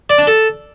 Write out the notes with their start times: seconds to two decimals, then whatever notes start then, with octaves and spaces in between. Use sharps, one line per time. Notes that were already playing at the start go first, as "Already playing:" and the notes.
0.10 D5
0.18 D4
0.27 A4